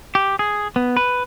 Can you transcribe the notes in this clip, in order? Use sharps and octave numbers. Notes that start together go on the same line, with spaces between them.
G4
G#4
B3
B4